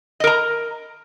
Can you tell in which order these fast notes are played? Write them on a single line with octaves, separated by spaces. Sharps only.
D#5 A#4 A#5